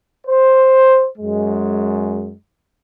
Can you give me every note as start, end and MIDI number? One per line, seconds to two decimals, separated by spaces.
0.27 1.07 72
1.18 2.34 42
1.18 2.34 56